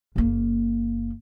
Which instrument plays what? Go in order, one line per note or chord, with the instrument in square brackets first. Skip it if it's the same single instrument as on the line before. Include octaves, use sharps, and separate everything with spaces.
[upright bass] F#1 A#3